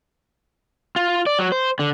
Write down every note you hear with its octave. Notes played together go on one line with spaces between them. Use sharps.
F4
D5
F#3
C5
D3